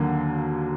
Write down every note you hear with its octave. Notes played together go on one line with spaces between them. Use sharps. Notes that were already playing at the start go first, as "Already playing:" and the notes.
Already playing: D#2 D3 F#3 A#3